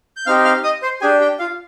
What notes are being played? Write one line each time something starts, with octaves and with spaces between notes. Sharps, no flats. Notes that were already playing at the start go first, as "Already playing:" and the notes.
G6
C4 D#4 G4 F5 F6
F5 F6
D#5 D#6
C5 C6
D4 G4 G#4 G#5
G4 G5
F4 F5